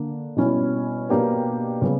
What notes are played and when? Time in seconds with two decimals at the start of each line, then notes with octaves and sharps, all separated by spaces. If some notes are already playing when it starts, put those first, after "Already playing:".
Already playing: D3 A#3 D4
0.37 B2 G3 C#4 E4
1.09 B2 A#3 D4 G4 B4
1.82 C#3 G3 B3